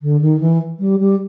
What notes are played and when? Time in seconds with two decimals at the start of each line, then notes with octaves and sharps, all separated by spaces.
0.02 D3
0.21 D#3
0.40 E3
0.79 G3
0.99 G3